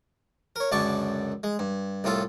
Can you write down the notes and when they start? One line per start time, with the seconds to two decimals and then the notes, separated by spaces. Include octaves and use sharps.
0.56 A#4 C#5
0.72 C#2 F#2 D3 D5 A5 C#6
1.43 G#3
1.59 G2
2.04 C2 A2 F4 A4